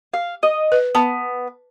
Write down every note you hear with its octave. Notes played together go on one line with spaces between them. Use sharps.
F5
D#5
B4
B3 A5